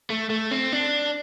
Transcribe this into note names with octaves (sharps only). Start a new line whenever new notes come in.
A3
A3
C4
D4